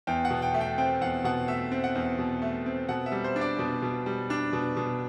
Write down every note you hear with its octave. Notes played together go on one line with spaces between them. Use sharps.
E2 G5
F#5
B2
G5
A3
G5
C4 G5
E2 F#5
B2 F#5
A3 E5
C4
F#5
E2
B2
A3
C4
B2 F#5
E5
G3
C5
D4
D5
B2
B2
G3
D4
B2
B2